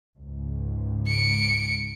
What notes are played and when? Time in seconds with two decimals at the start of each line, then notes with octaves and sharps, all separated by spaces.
0.19 C#2 G#2
1.07 C#7 D7